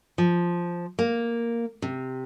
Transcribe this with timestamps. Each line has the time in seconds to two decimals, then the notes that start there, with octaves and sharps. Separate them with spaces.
0.18 F3
0.99 A#3
1.82 C3